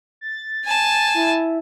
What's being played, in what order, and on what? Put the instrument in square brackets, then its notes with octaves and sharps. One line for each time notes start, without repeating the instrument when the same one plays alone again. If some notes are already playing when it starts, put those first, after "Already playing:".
[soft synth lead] A6
[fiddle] G#5 A5
[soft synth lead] E4